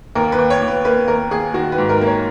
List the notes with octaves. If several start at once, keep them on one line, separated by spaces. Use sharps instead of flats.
D#2 A#4
B4
D#2
C#5
D#2
B4
A#3 B4
D#2 A#4
D#2 G#4
D#3 F#4
B4
G#2
A#4
A#3
C#5